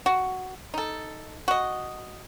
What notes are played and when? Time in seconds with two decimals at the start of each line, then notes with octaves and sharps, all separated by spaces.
0.06 F#4
0.74 D#4 A4
1.48 F#4 D#5